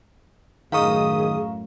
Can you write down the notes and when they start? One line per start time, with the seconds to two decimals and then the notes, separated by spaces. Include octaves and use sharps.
0.72 F#2 A2 D#3 G#4 F5 A#5 C#6 D#6